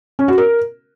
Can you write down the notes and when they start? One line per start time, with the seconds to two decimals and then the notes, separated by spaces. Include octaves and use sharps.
0.19 C#4
0.28 F#4
0.38 A#4